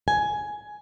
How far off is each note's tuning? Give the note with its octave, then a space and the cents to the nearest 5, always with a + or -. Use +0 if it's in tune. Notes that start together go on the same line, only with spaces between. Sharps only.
G#5 +10